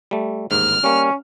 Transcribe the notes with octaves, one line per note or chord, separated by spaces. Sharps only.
G3 A3
A1 D#2 G#2 F6
G3 A#3 C#4